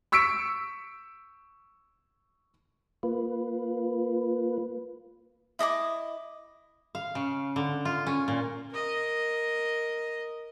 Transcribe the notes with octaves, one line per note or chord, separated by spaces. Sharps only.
C#6 E6 B6 C#7 D7
A#3 F4 B4
E4 D#5 A5 D6
F5
C#3
D3
F4
C#4
A#2
A#4 D#5